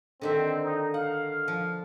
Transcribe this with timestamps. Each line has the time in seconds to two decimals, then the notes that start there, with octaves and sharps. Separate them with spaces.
0.21 D3 D#3 C4 E5
0.64 D#4
0.94 F5 F#5
1.48 F3